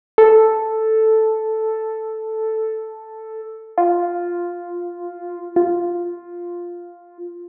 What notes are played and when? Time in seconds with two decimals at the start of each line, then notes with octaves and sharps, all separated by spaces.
0.18 A4
3.78 F4
5.56 F4